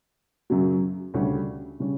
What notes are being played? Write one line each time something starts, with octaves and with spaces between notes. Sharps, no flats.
F#2 C#3 F#3
D2 C#3 G3 C#4
C#3 G3 C#4